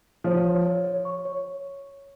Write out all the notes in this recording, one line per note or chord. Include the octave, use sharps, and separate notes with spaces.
F3 C#5
C#5
C#5
C#5
C#6
C#5